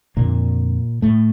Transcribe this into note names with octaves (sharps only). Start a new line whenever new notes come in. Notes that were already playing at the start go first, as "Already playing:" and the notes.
F2 A#2 D3 A#3
A2 A3